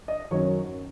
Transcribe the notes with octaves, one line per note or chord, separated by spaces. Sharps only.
D#5
F#2 D#3 F#3 C#5